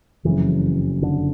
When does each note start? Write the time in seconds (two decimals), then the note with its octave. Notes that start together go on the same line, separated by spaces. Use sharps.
0.24 F#1 F2 C#3 E3 F#3
1.02 D3